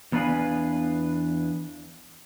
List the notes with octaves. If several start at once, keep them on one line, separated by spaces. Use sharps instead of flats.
E2 B3 D4 B4 F5 G#5